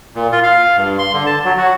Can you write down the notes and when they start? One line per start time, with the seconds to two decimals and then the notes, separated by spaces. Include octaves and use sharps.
0.15 A#2
0.32 F4
0.43 F5
0.77 G2
0.99 C6
1.13 D3
1.26 A5
1.45 F#3
1.57 F#4